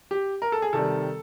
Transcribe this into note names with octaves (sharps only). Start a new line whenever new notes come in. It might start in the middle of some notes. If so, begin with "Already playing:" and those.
G4
A#4
A4
G#4
C3 D#3 G3 A4